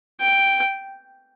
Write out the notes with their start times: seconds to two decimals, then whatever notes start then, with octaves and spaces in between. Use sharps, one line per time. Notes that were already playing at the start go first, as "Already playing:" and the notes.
0.21 G5